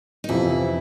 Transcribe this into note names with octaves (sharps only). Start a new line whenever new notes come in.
D#4
F2 C3 E3 E4